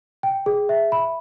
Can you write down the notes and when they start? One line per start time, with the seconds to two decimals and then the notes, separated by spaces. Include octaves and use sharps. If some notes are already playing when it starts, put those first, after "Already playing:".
0.23 G5
0.46 G#4
0.69 E5
0.92 B5